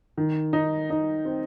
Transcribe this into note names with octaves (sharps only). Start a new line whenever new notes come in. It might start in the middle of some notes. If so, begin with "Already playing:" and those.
D#3
D#4
D#4
C4